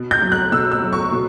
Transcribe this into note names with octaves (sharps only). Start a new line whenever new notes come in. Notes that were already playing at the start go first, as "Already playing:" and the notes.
Already playing: B2
G6
F#3
F#6
B2 E6
E6
F#3
C#6
B2